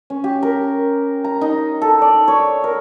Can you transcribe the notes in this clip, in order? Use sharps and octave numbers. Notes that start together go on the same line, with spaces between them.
C#4
G4
A#4
A#5
D#4
A4
D5
C#5
A#4